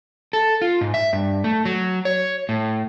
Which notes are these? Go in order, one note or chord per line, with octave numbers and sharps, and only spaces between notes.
A4
F4
G#2
E5
G2
A3
F#3
C#5
A2